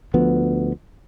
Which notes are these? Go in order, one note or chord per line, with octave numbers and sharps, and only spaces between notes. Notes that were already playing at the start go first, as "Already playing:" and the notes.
D2 F3 B3